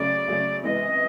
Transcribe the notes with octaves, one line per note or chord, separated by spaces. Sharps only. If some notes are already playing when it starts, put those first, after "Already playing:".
Already playing: C#3 F#3 A3 C#4 D5
C#3 F#3 A3 C#4
C3 E3 G#3 B3 D#5